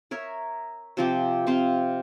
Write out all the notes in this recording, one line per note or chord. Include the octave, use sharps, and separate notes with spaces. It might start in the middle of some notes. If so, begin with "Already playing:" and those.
A#4 C#5 E5
C3 F3 C4 D6
C3 C4 C5 F5